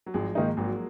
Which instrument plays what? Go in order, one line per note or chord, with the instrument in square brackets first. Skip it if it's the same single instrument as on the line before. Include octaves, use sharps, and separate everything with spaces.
[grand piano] F#3
[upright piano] G#1 [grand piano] F3 G#3
[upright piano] G#2 D#3 A#3 D#4
[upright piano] G#1 [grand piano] F#3 A#3